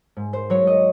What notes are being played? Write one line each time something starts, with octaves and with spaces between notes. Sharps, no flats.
G#2
C5
F#3 C#5
D#5